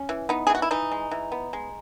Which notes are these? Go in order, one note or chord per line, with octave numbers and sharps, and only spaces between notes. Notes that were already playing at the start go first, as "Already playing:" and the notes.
Already playing: C#4
E3
B3 D#4
G#4
E3 F#4
E4
E3 D#4
G#3
E3
B3
G#3